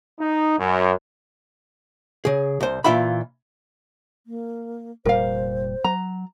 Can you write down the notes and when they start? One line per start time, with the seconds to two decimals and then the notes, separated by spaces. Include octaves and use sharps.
0.20 D#4
0.59 F#2
2.25 C#3 G#4
2.61 C2 C5
2.84 A#2 E3 F4 E5 B5
4.26 A#3
5.05 F1 A#2 G3 A#4 C5 F5
5.84 F#3 A#5